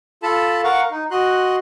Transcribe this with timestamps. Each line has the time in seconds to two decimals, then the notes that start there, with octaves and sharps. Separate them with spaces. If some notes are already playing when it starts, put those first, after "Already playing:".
0.23 F4 A4 A5 B5
0.64 A#4 F5 F#5 C#6
0.91 D#4
1.11 F#4 D#5 C6 F#6